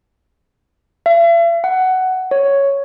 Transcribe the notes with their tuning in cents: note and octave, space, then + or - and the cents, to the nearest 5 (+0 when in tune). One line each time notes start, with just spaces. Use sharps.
E5 +45
F#5 +15
C#5 +0